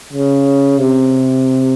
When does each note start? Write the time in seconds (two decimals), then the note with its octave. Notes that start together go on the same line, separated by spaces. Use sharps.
0.13 C#3
0.78 C3